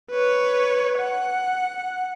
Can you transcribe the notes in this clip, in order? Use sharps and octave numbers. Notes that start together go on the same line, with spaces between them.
B4 C#5
F#5